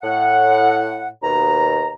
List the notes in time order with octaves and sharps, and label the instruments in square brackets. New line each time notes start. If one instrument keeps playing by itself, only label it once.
[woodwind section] A2 F#5
D#2 B2 A#5